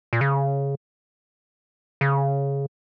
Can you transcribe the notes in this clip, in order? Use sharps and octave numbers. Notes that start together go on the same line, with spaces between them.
A#2
C#3
C#3